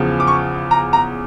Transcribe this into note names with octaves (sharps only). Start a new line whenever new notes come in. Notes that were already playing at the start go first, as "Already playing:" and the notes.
Already playing: E2 C#3 F3
D6
C#6
A#5
A#5